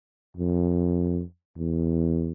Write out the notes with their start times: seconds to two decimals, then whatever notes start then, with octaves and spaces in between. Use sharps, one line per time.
0.37 F2
1.58 E2